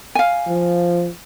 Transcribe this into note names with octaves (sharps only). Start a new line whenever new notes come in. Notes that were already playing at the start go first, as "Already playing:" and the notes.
F5 G#5
F3